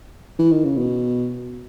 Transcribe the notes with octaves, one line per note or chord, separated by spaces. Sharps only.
E3
D#3
C#3
B2